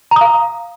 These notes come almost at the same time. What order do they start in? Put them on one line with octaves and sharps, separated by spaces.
A#5 D#6 F5